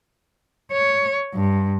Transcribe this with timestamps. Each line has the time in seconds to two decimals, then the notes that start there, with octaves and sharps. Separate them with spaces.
0.72 C#5
1.34 G2